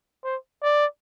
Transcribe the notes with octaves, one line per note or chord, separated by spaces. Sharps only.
C5
D5